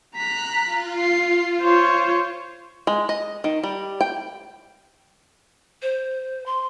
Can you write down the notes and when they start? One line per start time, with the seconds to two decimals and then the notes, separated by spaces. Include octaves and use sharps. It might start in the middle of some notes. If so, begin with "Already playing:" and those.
0.16 A#5 F#6 B6
0.63 F4
0.98 C7
1.62 C5 C#5
2.87 G#3
3.09 D#5
3.44 D#3
3.63 G3
4.01 G5
5.82 C5
6.46 C6